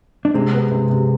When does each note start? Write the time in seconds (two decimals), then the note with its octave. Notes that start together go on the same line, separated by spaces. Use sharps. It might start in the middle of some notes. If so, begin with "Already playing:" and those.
0.25 D4
0.34 C3 G#3 C4
0.53 B3
0.72 C3
0.90 C3